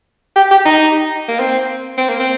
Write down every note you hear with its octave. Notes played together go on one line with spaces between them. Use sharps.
G4
G4
D#4
A#3
C4
C4
A#3
C4